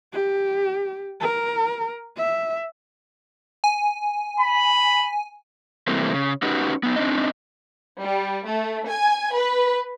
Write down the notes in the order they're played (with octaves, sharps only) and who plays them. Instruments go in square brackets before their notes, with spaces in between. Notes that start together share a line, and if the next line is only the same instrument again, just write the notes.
[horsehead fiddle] G4
A#4
E5
[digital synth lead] G#5
[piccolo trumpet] B5
[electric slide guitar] C3 E3 G3 A3 A#3 C4
C#3
C#4 D#4 F#4 G4 B4
B3 D#4
C4 D4 D#4 D#5
[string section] G3
A3
G#5
B4